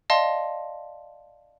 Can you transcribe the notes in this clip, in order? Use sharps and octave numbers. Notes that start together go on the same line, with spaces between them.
D5 D#5 F5 A5 C6